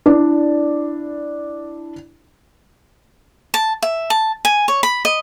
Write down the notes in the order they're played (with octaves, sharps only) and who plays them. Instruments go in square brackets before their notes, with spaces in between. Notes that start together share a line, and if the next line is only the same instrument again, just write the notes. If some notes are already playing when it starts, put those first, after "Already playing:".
[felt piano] D4 E4 D5
[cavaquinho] A5
E5
A5
G#5
C#5
B5
D#5